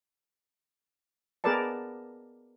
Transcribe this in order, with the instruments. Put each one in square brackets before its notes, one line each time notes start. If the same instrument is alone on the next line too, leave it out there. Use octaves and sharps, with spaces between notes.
[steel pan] B3 G#4 A#4 B4 D5 A5